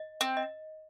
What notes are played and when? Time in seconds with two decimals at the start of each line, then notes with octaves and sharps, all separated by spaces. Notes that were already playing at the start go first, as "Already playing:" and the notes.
Already playing: D#5
0.21 C4
0.37 D#5